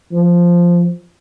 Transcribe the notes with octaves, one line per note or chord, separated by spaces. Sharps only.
F3